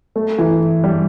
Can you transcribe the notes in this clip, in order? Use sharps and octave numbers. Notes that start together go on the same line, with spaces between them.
A3
E3
G3